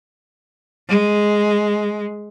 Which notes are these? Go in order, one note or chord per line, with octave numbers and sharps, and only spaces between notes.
G#3